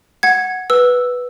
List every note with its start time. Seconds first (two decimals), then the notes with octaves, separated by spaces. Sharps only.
0.23 F#5 G#6
0.70 B4 E6